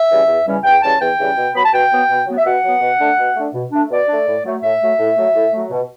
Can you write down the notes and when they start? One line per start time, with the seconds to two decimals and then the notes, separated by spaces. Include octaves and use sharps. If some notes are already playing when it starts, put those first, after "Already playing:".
Already playing: E5
0.10 C#3 E3 G3 C#4
0.28 E2
0.46 C#3 E3 G3 C#4
0.64 E2 G5
0.82 C#3 E3 G3 C#4 A5
1.00 E2 G5
1.18 C#3 E3 G3 C#4
1.36 B2
1.54 F#3 B3 B5
1.64 A5
1.73 B2 G5
1.91 F#3 B3
2.10 B2
2.27 F#3 B3
2.38 E5
2.45 B2 F#5
2.63 F#3 B3
2.81 B2
2.99 A3 D4
3.18 B2
3.35 A3 D4
3.54 B2
3.72 A3 D4
3.90 B2 D5
4.08 A3 D4
4.26 A2
4.45 F#3 A3
4.62 A2 E5
4.81 F#3 A3
4.99 A2
5.17 F#3 A3
5.35 A2
5.53 F#3 A3
5.71 B2